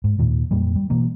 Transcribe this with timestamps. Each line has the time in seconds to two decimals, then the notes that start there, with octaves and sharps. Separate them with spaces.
0.04 G#2
0.19 D#2 A#2 D#3
0.51 F2 A#2 G3 A#3
0.76 G3
0.90 B2 E3 A#3